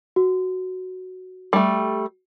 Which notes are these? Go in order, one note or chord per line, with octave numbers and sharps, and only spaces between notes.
F#4
G3 A3